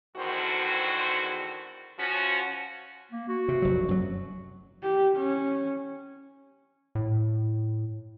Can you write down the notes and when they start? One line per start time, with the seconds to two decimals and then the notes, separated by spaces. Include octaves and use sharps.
0.17 E2 G#2 D3 D#3 F#4 C5
1.98 F3 C#4 F#4
3.12 A#3
3.29 F#4
3.48 C3
3.62 F1 F#3
3.88 F#2 F#3
4.83 G4
5.17 C#4
6.95 A2